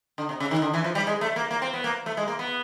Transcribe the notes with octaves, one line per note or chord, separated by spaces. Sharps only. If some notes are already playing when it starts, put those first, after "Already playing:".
D3
C3
C#3
D#3
D3
E3
F3
G3
G#3
A3
A#3
A#3
C4
B3
A#3
A3
G#3
A#3
B3